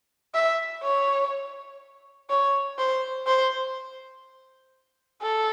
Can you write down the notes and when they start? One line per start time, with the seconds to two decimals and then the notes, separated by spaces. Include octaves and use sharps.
0.34 E5
0.83 C#5
2.30 C#5
2.78 C5
3.27 C5
5.22 A4